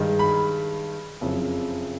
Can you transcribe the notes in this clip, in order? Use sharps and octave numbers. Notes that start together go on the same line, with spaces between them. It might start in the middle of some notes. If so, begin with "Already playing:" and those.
Already playing: G2 D#3 G#3
B5
F#1 F2 C#3